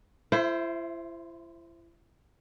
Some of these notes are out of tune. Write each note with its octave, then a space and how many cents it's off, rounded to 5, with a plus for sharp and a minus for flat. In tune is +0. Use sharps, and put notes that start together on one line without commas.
E4 +40 C5 +0 E5 +5